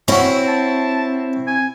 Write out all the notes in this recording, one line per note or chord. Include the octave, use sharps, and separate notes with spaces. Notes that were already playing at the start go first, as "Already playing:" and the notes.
C4 C#4 E4 F#4
A5
G#5